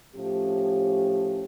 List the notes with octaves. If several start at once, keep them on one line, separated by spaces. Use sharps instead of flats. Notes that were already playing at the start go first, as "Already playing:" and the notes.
A2 F3 C#4 G4